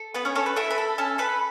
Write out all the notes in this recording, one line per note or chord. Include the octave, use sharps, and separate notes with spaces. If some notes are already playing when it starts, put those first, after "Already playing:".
Already playing: A4
B3 B4
C#4 C#5
C#4 A4 C#5
B4
A3 E4 E5
B4 B5
A4
C#4 A4 A5
A4 B4 B5